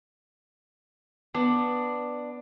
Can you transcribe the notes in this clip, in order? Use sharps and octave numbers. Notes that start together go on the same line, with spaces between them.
B3 D4